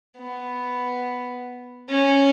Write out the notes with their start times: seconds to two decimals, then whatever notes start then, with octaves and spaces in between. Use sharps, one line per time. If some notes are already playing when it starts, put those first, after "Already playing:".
0.18 B3
1.89 C#4